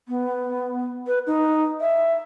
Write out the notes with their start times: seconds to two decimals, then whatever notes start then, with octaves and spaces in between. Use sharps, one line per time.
0.08 B3
1.07 B4
1.27 D#4
1.81 E5